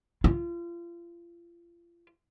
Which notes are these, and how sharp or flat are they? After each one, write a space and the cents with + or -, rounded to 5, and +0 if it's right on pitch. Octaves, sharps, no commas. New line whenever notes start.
F4 -35